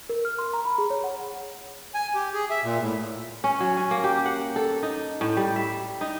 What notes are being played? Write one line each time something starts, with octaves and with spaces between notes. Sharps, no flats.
A#4
F6
C6
A#5
B5
G#4
C#5
F#5
G#5
G4
G#4
E5
A#2
A2
C#4
F#3
C#4
A#3
G4
F#5
A4
D#4
A2
G3
E5
D#4